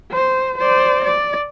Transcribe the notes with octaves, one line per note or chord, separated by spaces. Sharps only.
C5
C5 D5
D5